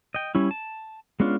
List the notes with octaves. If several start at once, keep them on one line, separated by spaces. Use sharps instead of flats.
D#5 G5
G3 C#4 E4
A5
G#3 B3 C#4 D4 F4